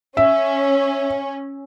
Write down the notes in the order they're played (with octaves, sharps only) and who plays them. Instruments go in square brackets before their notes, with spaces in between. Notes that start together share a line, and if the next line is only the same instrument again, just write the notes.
[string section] C#4 [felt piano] E5